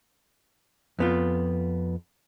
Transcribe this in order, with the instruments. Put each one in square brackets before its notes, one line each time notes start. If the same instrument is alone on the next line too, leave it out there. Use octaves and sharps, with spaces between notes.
[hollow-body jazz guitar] F2 B3 F4